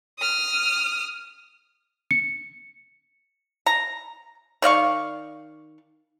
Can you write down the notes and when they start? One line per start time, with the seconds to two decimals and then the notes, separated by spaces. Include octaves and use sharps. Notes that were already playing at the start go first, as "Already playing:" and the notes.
0.19 D#6 F6
2.11 C#7
3.66 A#5
4.62 D#3 D5 F5 C#6